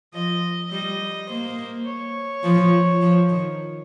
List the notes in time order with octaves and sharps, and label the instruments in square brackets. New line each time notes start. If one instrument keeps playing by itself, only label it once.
[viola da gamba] F3 [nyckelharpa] D#5
[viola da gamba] G3 [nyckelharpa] D#5
[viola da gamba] A#3 [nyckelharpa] C5
[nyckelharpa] C#5
[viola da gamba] F3
F3
D#3